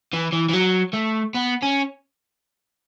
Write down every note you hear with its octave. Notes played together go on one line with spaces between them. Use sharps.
E3
E3
E3
F#3
A3
B3
C#4